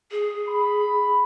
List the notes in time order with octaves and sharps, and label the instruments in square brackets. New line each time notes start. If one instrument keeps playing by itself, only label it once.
[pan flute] G#4
[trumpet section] B5